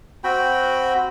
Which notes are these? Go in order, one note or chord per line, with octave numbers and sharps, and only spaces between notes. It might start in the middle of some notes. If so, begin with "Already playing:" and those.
C4 F#4 G5 B5